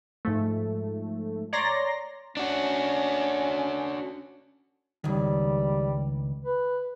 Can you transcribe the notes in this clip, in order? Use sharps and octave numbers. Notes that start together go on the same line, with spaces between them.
G#2 F3 A3
C#5 D5 A#5 C6 A#6
C#4 D4 F#4
C#2 D#3 G3
B4